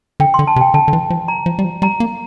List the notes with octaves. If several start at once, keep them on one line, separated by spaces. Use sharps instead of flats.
D3 G5
D3 C6
A5
C3
G5
D3 A5
D3
E3
F3
A#5
F3
G3
F3
G3 A#5
A#3